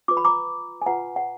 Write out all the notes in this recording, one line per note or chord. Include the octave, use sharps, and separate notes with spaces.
F4 B4 D6
B5
A#5 D6
G#5
F4 B4 F#5 A#5
F#5